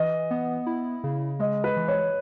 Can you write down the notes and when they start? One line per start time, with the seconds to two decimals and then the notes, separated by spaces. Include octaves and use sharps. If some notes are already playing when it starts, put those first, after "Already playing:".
Already playing: E3 D#5
0.31 B3
0.66 E4
1.04 C#3
1.39 G#3 D#5
1.64 B4
1.77 E3
1.88 C#5